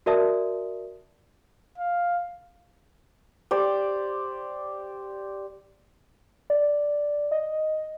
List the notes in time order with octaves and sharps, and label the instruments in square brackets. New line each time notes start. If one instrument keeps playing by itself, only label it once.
[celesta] F#4 A#4 D5 E5 A5 D#6
[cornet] F5
[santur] G4 C5 D5
[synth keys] D5
D#5